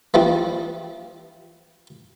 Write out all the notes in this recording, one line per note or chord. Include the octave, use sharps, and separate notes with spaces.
E3 F3 G3 D4